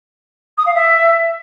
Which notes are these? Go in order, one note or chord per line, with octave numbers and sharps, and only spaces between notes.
D#6
F5
E5